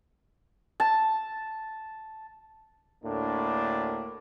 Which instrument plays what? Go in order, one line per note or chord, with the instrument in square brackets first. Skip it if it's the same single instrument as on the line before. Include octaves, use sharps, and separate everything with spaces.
[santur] A5
[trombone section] D2 A2 A#3 D4